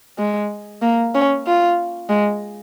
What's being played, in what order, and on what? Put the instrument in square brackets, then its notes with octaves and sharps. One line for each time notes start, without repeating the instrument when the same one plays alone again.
[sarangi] G#3
A#3
C#4
F4
G#3